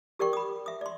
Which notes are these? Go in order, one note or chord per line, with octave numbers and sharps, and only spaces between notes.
G4 A#4 D5 G5 C#6
B5 D#6
E5 D#6
D5 C6